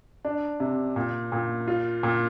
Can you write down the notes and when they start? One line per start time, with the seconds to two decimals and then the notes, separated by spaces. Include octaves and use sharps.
0.25 D4
0.60 C3
0.96 A#2
1.32 A#2
1.68 F4
2.03 A#2